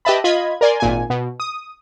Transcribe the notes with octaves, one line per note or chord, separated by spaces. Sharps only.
G4 B4 D#5 E5 A5 B5
F4 D#5 B5 G#6
A#4 D5 G#5 C6
G#1 A#2 G#5
B2
D#6